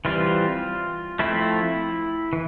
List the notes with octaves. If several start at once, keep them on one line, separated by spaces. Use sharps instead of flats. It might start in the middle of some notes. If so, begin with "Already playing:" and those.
E3 G3 C4 F4
F3 A3 C4 E4
E3